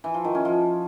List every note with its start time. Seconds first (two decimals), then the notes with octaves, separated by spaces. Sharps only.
0.04 E3
0.14 F3
0.24 D#3
0.35 C#4
0.45 F3